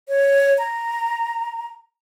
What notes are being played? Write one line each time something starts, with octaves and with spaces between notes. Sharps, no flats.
C#5
A#5